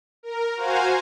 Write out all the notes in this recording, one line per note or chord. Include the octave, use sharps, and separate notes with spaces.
A#4
F#4 C5 F5 G#5 A#5